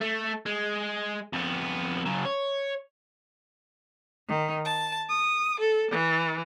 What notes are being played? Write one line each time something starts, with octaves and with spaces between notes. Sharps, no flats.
A3
G#3
F2 B3
C#3 F#3
C#5
D#3
A5
D#6
A4
E3